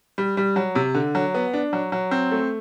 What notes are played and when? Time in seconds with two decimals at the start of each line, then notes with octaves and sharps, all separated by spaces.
0.18 G3
0.37 G3
0.56 F#3
0.75 C3
0.94 D3
1.15 F#3
1.34 B3
1.53 D4
1.73 F#3
1.92 F#3
2.11 C4
2.31 A3